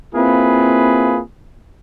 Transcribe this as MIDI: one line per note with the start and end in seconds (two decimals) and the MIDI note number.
0.15 1.19 58
0.15 1.19 60
0.15 1.19 64
0.15 1.19 65
0.15 1.19 68
0.15 1.19 71